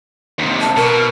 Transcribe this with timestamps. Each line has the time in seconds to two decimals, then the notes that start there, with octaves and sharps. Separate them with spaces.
0.39 D#2 C3
0.61 A5
0.76 B2 A#4